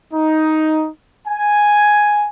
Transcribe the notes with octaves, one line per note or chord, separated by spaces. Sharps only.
D#4
G#5